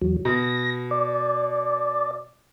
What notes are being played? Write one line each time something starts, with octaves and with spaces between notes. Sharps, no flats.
E2 F#3
B2 A#6
D5